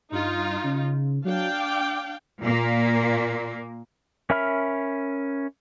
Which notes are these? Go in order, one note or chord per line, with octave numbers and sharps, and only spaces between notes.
G2 D#4 F4
C#3
F#3 D4 F5 G5
D6
A#2 A#3
C#4 A#4 E5 B5 F6